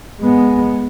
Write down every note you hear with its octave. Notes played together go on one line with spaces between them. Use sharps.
G#3 B3